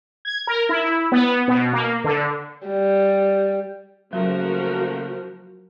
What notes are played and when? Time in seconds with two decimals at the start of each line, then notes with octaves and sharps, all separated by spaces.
0.25 G#6
0.47 A#4
0.69 E4
1.12 B3
1.48 B2
1.73 A#3
2.04 D3
2.67 G3
4.13 C#3 F3 F#3 A3 A#3 F#4 A#4